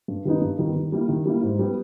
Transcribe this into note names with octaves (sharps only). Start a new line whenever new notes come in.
G2
D#3 G3 B3 D#4
G2
D#3 G3 B3 D#4
D#3
G3 A#3 E4
D#3
G3 A#3 E4
G#2
G3 B3